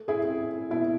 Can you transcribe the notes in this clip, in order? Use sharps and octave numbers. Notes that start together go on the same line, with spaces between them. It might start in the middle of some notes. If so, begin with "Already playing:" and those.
Already playing: A3
E4 G#4
C4
B2 E4